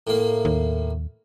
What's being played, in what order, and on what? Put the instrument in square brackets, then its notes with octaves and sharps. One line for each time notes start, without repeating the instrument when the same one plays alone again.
[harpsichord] A2 A#3
[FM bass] D#2